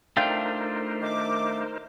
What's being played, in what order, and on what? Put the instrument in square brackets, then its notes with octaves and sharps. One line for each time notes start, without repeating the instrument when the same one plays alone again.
[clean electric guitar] A3 D4 F4 [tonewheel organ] D#4 A#4 C5 [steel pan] F5 G5
[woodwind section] D#3 D6